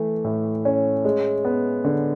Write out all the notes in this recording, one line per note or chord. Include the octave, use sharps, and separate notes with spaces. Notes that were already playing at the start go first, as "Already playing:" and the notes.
Already playing: E3 A3
A2
C#4
G#3
B3
D3